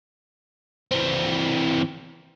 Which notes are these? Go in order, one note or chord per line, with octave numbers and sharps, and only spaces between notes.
E3 C4